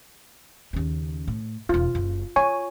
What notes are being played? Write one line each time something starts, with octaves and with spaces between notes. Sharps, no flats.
D#2 C#3
A2
E1 D#3 F4
F#1 C#3
F4 C#5 G#5 C#6